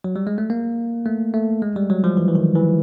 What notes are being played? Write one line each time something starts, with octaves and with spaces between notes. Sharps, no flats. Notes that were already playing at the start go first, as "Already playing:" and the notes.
F#3
G3
G#3
A3
A#3
A3
A3
G#3
G3
F#3
F3
E3
E3
D#3
E3